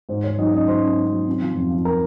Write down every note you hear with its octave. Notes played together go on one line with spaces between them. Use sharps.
G#2 C5
G#2 C#5
F#3 D#4 D#5
C#4 D#4 D#5
F#3 C5 C6
C#4
C#4
F#3
C3
F3
F2
F3
A#4 A#5